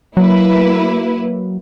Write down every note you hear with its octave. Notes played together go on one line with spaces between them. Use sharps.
F#3 A#3 E4 B4